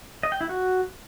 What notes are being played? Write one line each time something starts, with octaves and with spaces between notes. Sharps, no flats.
D#5
G5
E4
F#4